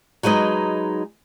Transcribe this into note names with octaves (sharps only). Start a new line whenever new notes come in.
F#3 G#3 D#4 B4 D#5